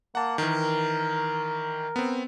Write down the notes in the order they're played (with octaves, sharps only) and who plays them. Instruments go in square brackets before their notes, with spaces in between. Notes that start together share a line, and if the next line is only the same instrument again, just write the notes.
[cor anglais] A#3 [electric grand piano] F#5 A5
[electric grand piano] D#3 E3 [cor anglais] A#4
[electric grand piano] B3 C4